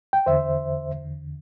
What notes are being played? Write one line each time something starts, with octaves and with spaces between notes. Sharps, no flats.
G5
E2 D3 C5 E5